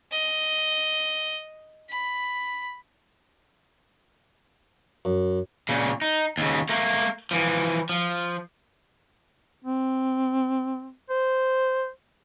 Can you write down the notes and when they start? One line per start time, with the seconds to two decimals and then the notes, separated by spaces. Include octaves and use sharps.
0.11 D#5
1.90 B5
5.05 F#2
5.69 A#2 C#3
6.02 D#4
6.38 D#2 C#3
6.69 A3 A#3
7.31 E3 F3
7.90 F3
9.65 C4
11.10 C5